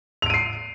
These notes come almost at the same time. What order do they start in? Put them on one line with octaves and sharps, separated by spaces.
F7 D7 D#7 C7